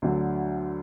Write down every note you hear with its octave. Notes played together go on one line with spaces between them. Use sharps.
D2 D3 F#3